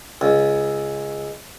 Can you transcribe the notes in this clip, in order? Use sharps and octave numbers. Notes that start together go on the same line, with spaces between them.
C#2